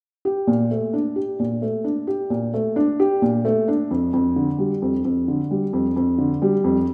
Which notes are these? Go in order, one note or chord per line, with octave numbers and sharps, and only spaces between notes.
G4
A#2
A3
D4
G4
A#2
A3
D4
G4
A#2
A3
D4
G4
A#2
A3
D4
F2
F2
D3
G3
F2
F2
D3
G3
F2
F2
D3
G3
F2